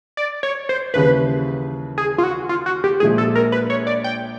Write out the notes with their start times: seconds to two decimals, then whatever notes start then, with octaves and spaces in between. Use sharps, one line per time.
0.17 D5
0.43 C#5
0.69 C5
0.94 D#2 C#3 E3 G3 B4
1.98 G#4
2.18 F4
2.23 F#4
2.49 F4
2.66 F#4
2.84 G4
3.00 A#1 A#2 F3 G#3 G#4
3.18 A4
3.35 A#4
3.52 B4
3.70 C#5
3.87 D5
4.04 G5